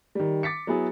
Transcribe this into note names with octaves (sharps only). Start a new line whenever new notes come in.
D#3 G3
D6 A6 B6 C#7
F#3 B3 E4 G#4